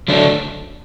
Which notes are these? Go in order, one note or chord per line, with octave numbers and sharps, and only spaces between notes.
D3 F#3 A3 D4